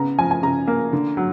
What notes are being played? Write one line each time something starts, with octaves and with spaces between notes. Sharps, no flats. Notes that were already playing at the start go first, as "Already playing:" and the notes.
Already playing: C#3 B3 A#5
F3 G#5
G#5
C#3 A#5
A#3
D3
F#3